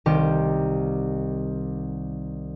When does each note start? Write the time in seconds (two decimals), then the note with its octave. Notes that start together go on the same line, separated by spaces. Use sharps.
0.06 C2 D#3 G4